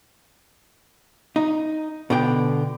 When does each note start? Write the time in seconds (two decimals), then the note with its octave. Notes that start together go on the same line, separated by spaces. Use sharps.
1.36 D#4
2.10 B2 D3 G5